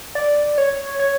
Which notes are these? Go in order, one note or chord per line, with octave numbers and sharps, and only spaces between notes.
D5
C#5
C#5